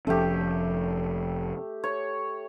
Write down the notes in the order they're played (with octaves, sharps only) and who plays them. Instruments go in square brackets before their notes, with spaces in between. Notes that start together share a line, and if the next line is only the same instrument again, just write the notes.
[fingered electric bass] F1 F3 C#4 [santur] A3 G4
[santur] C#5